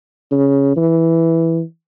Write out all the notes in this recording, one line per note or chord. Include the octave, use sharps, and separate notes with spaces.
C#3
E3